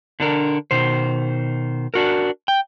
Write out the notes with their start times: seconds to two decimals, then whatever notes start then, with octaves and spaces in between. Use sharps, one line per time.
0.20 D3 D4 A#4
0.71 B2 D#3 C5
1.94 D4 F#4 A#4
2.48 G5